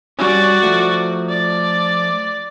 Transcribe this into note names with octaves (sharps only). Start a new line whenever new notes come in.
G3 C#4 F#4 D5
F3 A3
D5